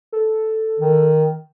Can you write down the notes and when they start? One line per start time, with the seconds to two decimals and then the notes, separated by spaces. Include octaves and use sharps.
0.12 A4
0.80 D#3